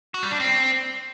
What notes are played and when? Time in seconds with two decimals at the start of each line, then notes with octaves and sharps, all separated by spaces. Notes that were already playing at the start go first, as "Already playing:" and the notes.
0.14 F#4
0.23 G3
0.31 D4
0.40 C4